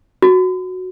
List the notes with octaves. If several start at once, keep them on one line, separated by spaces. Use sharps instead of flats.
F#4